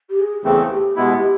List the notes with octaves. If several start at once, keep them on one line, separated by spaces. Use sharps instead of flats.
G4
G#4
E2 C#3 E3 A3 C4 G#4
G4
B2 G#3 B3 E4 G4
G4